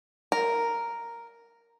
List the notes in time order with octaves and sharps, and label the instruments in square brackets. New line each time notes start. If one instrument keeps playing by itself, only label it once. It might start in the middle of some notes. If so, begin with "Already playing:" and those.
[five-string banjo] A#4